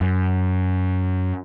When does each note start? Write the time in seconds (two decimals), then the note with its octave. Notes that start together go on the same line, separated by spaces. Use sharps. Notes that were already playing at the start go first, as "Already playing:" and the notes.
0.01 F#2